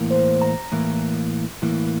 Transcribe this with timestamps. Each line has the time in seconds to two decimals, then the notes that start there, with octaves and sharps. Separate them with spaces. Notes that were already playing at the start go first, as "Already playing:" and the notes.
Already playing: A2 E3 A#3
0.11 C5
0.42 A#5
0.72 A2 E3 A#3
1.62 A2 E3 A#3